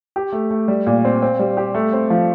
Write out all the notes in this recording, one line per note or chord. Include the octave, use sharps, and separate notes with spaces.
G4
A3
A3
G3
A#2
C4
C4
G3
G4
A3
C4
F3